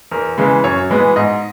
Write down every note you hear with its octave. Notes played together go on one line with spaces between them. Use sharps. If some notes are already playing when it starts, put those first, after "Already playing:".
E2 A#4
C#3 E3 G#3
F#2 C#5
E3 G#3 B3
G#2 D#5